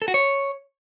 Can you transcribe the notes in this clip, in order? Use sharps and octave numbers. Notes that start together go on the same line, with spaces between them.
A4
F#4
C#5